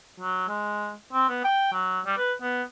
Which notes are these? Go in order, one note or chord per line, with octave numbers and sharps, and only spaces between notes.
F#3
G#3
C4
B3
G5
F#3
G3
B4
B3